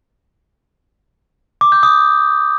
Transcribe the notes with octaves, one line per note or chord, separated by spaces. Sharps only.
D6
G6
D#6